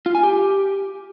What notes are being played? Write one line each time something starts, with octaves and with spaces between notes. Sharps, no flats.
F4
G#5
G4